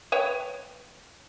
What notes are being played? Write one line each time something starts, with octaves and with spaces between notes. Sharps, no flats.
B4 C#5 G5